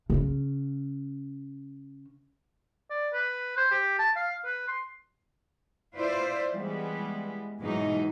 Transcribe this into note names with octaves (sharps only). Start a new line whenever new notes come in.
C#3 C#4
D5
B4
C5
G4
A5
F5
B4
C6
E4 F4 B4 C5 D5 E5
E3 G3 G#3 B3
G#2 B2 E3 F#3 G#3 D#4